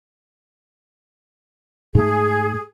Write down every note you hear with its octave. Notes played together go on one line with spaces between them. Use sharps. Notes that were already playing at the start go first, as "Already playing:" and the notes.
G#2 A3 G#4